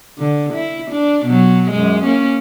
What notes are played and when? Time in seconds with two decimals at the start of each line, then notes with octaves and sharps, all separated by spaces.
0.19 D3
0.54 E4
0.91 D4
1.26 B2 F#3
1.71 F#2 G#3
2.04 A#3 C#4